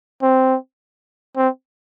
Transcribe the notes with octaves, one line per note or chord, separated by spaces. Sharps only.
C4
C4